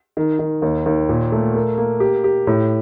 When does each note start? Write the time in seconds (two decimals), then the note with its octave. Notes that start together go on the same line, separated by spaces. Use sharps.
0.17 D#3
0.39 D#3
0.62 D#2
0.86 D#2
1.09 A#2
1.32 A3
1.54 A#3
1.78 A#3
2.00 G4
2.24 G4
2.47 A2